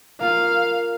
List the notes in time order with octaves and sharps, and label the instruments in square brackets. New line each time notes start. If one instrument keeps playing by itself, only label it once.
[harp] A#3 F4 [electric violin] F5